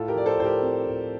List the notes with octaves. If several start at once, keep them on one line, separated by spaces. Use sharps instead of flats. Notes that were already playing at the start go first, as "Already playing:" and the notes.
Already playing: A2 F4 A4
G4 A#4
F3 D5
A4 C5
A2 C5
G4 A#4
C4
A2